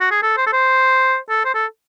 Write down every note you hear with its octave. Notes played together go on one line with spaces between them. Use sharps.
F#4
G#4
A4
C5
A4
C5
A4
C5
A4